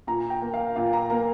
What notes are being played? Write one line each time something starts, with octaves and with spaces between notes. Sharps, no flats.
A#2 A#5
G5
A#3
F5
A#2 F5
A#5
A#3 A#5